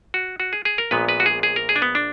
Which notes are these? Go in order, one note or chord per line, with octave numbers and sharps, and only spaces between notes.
F#4
F#4
G#4
G#4
A#4
A#1 A#2 G#3 B3 B4
B4
F#4
G#4
G#4
A#4
G#4
D4
B3
D4